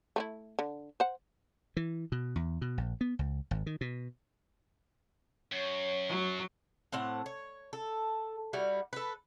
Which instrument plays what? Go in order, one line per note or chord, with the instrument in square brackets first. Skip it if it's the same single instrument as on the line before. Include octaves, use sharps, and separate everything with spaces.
[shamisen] A3 C4 E4
D3
C5 F#5
[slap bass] E3
B2
E2
B2
A#1
B3
C#2
G#1
D#3
B2
[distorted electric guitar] F#2 [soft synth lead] C#5
[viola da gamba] F#3
[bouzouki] A2 C4 F#5 A5
C#5
A4
G3 E4 F#4
A4 B4